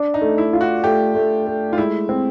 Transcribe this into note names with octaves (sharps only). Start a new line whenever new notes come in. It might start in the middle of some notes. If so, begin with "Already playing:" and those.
Already playing: D4
D#4
A3
E4
F4
F#4
A3 G4
A3
A3
F4
G#3 E4
C4